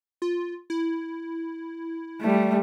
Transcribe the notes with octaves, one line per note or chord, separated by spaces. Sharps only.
F4
E4
G3 A3